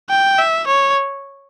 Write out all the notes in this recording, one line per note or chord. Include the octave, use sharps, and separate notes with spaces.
G5
E5
C#5